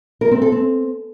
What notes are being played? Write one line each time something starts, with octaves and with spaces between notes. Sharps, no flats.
A#4
C4
A4
C4